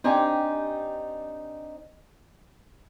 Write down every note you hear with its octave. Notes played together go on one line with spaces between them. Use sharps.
C4 D4 D#4 G4 G5 G#5